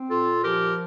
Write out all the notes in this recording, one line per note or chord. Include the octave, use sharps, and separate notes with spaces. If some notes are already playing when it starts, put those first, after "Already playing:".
Already playing: C4
A#2 F4 A4
F3 G4 A#4